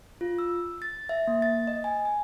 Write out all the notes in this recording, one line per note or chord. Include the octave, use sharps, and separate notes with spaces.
F4
E6
A6
E5
A#3
A6
D#5
G#5
G#5